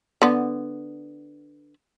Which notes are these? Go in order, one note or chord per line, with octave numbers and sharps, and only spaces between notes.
D3 B3